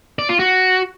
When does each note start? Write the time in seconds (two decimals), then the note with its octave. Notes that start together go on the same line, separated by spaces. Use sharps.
0.19 D5
0.29 F4
0.39 F#4